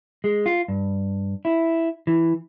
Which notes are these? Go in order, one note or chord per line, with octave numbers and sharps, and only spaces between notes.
G#3
F4
G2
E4
E3